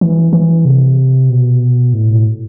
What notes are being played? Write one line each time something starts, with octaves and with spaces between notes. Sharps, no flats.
E3
E3
C3
B2
A2